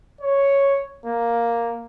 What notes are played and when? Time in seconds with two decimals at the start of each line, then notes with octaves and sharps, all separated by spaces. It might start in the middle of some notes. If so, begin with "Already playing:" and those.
0.21 C#5
1.06 A#3